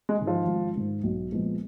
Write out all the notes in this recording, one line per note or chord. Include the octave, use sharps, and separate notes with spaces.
G#3
G#2 D#3
F3
G#1
G#2 D#3
B1
A#2 F3 G#3 B3